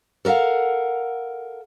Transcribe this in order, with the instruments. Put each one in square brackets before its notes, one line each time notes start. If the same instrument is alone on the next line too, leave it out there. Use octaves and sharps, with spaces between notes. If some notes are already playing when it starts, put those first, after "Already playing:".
[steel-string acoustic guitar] A4 A#4 D#5 F5 F#5